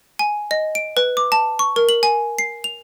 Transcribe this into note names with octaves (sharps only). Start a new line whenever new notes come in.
G#5
D#5
D7
B4
D6
A5
C#6
A#4
F#7
G#5
C7
F7